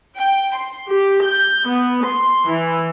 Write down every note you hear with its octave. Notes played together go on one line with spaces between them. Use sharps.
G5
C6
G4
G6
B3
C6
E3